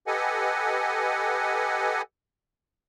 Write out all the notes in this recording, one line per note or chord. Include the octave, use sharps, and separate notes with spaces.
G4 A4 B4 D#5 F#5 G#5